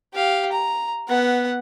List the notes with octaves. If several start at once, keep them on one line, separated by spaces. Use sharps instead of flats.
G4 F5
A#5
B3 F#5